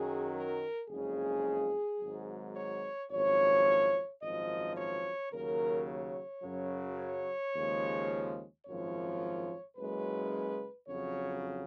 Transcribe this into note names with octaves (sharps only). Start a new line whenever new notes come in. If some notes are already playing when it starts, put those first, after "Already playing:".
Already playing: F#2 D#3 F#3 G#4
A#4
F#1 F2 C#3 G#3 G#4
G#1 G#2 F#3
C#5
G#1 F#2 F3 C#5
G#1 F#2 F3 D#5
C#5
D#2 C#3 F#3 A#4
C#5
F#2 C#3 F#3
C#5
D#2 C#3 F3 G#3
G#1 F#2 F3 C#5
F#1 F#2 C#3 G#3 B4
F2 C#3 F#3 C#5